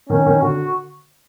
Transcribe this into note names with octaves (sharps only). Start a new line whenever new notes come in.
D#3 C#4
D#3
D3 F#4